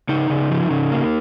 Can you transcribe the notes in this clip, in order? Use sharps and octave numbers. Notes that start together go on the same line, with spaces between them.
C#3 D#4
C#3
F3
C#3
A#3